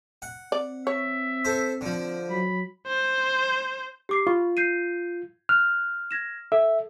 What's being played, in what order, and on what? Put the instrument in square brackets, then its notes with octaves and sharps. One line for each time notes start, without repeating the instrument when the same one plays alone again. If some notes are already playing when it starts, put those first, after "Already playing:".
[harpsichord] F#5
[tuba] C4 [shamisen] D5
[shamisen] C#5 [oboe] E5
[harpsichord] A4 C5
D3 F3
[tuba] F#3 [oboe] B5
[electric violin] C5
[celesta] G4 D6 C7
[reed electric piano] F4 [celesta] B5 C#6
[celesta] G6 C7 D#7
[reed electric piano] F6 [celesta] F#6
[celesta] G#6 A#6 E7
[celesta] A4 [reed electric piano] E5